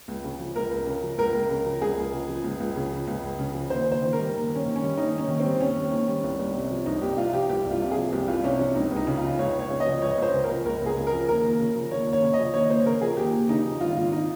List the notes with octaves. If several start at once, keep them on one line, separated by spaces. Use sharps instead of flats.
C#2
C#3
F3
C#2 A#4
C#2
C#3
F3
C#2 A#4
C#2
C#3
F3
C#2 G#4
C#2
C#3
F3
C#2
C#2
C#3
F3
C#2
C#2
C#3
F3
D#2 C5
D#2
C5
D#3
A#4
G3
D#2
D#2
C#4
D#3
C#4
G3
D#2 D#4
D#2
C#4
D#3
G3 C4
D#2 C#4
D#2
D#3
G3
C2
C2
C3
F3
C2 D#4
C2 G4
C3 F4
F3 G4
C2 G4
C2
F4
C3
G#4
F3
C2 G4
C2 F4
C3 C#4
F3 C#4
C#2 D#4
C#2 D#4
C#3
F3 F4
C#2 C#5
C#2 C#5
C#3
D#5
F3
C#2 C#5
C#2 C5
C#3
A#4
F3
C#2 A#4
C#2 G#4
C#3
A#4
F3
D#2 A#4
D#2
C#3
F3
D#2 C#5
D#2
C#5
C#3
D#5
F3
D#2 C#5
D#2 C5
C#3 A#4
F3 G#4
D#2 G4
D#2
C#3 D#4
F3
G#1 F4
G#1 F4
D#4